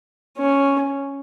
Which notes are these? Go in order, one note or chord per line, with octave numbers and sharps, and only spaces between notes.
C#4